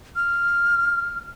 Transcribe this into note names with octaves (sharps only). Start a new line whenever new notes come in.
F6